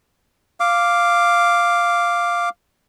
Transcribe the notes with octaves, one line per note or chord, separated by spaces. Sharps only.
F5 D6